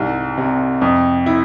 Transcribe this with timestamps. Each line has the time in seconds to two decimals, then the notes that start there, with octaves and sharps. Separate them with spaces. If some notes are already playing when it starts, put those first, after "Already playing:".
Already playing: C2 G#2
0.38 C3
0.81 F2
1.26 E4